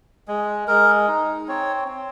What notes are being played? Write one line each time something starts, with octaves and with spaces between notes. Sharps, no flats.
G#3
G#3 A#4
D#4
C4 C#5
C4